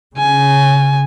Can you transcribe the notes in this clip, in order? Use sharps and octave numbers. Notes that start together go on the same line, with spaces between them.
C#3 G#5